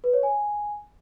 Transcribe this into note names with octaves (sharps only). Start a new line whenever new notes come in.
B4
C#5
G#5